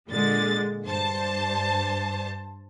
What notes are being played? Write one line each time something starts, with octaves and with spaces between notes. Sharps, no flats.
A#2 D3 G#3 A6
G2 C5 A5